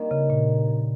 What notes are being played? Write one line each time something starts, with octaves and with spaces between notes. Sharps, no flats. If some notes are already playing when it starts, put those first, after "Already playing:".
Already playing: G2 C3 D#3 G3 A#3
C#3
A#2